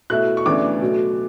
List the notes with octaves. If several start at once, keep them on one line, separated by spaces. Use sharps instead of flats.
B2 A3 E4 F#6
C#6
D2 C#3 E3 B3 D4 D6
B2 F#3 A3